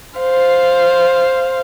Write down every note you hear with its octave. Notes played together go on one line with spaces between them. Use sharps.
C5 F5